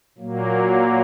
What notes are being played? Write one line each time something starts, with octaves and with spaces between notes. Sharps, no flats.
A#2 F#3 A#3